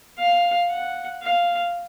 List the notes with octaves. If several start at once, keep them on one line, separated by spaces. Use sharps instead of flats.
F5
F#5
F5